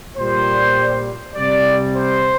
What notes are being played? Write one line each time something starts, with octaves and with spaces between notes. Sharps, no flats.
A#2 G3 C5
C3 G3 D5
C5